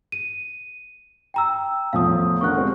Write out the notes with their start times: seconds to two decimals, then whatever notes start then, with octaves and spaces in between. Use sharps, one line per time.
0.12 D#7
1.34 G5 A#5 E6
1.93 E2 A2 F3 F5 D#6
2.41 D3 A#4 F#5 C#6 F#6
2.55 G3 G#3 C4